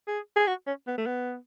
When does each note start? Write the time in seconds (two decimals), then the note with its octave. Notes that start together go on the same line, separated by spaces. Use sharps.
0.08 G#4
0.36 G#4
0.48 F#4
0.67 C#4
0.87 B3
0.98 A3
1.06 B3